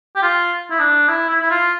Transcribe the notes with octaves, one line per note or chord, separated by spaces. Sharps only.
G4
F4
E4
D4
E4
E4
E4
F4